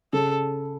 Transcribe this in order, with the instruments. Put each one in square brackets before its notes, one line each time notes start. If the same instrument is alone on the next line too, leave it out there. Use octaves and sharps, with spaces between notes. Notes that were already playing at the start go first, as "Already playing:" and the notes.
[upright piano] C#3 [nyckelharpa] A4